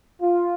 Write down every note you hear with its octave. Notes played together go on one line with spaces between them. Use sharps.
F4